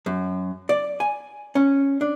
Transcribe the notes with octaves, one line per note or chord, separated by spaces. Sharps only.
F#2
D5
G#5
C#4
D4